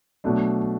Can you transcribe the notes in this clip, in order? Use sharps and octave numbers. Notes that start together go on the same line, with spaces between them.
B2 F#3 A3 D4